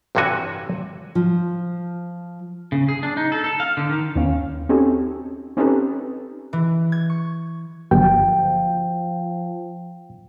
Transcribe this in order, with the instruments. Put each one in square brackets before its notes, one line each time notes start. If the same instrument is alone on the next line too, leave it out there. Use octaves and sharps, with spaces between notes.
[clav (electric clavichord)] A1 G2 C3 E3 F#4 G#5
[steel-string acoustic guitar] F3
[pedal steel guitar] C#3
G#4
D4
D#4
A4
A4
F5
D3
D#3
[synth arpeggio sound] D#2 B3 C#4 F5
C4 C#4 D#4 F#4 G4 A4
C4 C#4 D#4 G4 A4 B4
[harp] E3
G#6
C#6
[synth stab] G1 G2 [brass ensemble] F3 [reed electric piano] G5